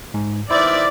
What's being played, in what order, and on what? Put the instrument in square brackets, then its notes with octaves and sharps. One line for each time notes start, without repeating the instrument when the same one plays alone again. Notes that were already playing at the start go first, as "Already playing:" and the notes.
[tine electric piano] G#2
[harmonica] D#3 B3 E5 [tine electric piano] E4 C5 [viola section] D5